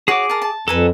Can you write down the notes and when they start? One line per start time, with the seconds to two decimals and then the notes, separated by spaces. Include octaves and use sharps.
0.08 F#4 G#4 C#5 D6
0.30 A#4 A5
0.42 A5
0.68 F2 A4 B4 G#5 A#5